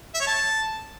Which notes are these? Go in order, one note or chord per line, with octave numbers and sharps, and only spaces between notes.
E5
C#5
A5